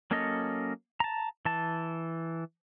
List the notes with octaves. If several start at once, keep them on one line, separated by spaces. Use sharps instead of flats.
F#3 A#3 C#4 A4 D#5
A5 A#5
E3 A5